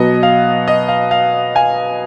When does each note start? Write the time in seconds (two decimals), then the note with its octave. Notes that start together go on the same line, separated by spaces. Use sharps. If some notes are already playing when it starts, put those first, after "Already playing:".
Already playing: B2 F#3 B3 D#5
0.23 F5
0.68 D#5
0.88 F5
1.11 F5
1.55 F5 G#5